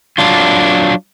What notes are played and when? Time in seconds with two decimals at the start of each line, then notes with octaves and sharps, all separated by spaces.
0.18 F#3 D4 F4